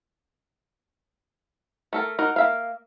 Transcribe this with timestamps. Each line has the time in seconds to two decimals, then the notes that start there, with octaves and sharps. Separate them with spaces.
1.93 A3 A4 A#4
2.19 D#4 F#4 A#4
2.36 A#3 E5 F5